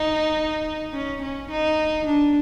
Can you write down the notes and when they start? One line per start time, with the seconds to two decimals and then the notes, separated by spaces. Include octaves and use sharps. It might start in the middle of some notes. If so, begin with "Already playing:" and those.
Already playing: D#4
0.93 C#4
1.22 C#4
1.51 D#4
2.07 D4